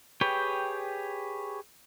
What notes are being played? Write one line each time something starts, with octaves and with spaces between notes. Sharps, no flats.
G4 G#4 B4 C#5 G5